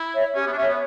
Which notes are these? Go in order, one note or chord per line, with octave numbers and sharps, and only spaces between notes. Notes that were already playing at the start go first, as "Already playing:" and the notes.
Already playing: E4
C#5 E5
C#4 G4
B3
D4
C#4 C#5 E5
B3